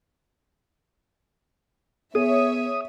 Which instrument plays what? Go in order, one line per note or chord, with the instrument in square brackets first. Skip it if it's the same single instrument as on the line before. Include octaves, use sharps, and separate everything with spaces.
[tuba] B3 [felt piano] G#4 [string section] C#5 E5 [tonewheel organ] D#6